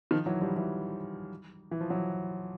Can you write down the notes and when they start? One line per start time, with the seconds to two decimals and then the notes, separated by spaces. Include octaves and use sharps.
0.11 D#3 F3
0.26 E3 F#3
0.41 F3 G3
0.56 E3 F#3
1.71 E3
1.81 F3
1.90 E3 F#3